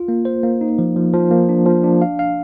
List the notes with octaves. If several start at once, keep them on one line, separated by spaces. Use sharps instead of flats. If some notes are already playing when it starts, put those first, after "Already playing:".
Already playing: F4
A#3
C5
A#3
D#4
F3
F3
F3
A#3
D4
F3
D4
F5
F5